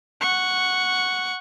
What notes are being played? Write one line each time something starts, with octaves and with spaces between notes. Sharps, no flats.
F#5 C#6